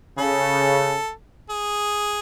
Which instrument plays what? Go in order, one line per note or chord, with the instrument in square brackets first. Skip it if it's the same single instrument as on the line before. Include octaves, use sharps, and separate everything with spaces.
[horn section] C#3 [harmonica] A4
[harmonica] G#4